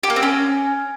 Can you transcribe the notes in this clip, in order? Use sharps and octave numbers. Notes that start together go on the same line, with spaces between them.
G4
A#3
C4
C#4